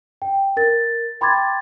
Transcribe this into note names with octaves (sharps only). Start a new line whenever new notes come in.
G5
A#4 A6
G5 B5 C6 D6 G#6 A6